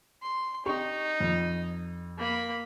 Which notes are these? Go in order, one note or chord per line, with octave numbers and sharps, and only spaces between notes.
C6
D#4 G4 C#6
F2
A#3 B5